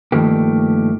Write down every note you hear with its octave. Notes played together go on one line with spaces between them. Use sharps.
G2 D#3 F3 A3 A#3 G4